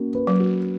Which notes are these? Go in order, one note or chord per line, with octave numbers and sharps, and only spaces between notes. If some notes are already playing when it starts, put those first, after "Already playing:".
Already playing: A#3 C#4 F#4
B4
F#3
F#4